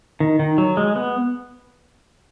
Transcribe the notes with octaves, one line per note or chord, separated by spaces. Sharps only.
D#3
D#3
F#3
G#3
B3